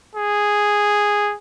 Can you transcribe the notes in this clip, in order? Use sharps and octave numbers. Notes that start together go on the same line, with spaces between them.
G#4